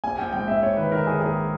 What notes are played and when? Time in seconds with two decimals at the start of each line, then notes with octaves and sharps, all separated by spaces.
0.04 A#1 G#5
0.18 A#1 G5
0.33 G#2 G5
0.48 A#1 E5
0.62 A#1 C#5
0.77 D#3 B4
0.92 D#3 A#4
1.07 D#3 G#4
1.21 A#1 G#4